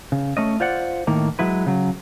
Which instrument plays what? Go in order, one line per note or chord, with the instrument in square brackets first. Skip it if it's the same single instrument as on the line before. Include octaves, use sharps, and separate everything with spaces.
[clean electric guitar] C#3
A3 C#4 D#5
F4 C5 D5 F#5
A2 D#3 A#3
F#3 G#3 E4 B4
C#3 F#3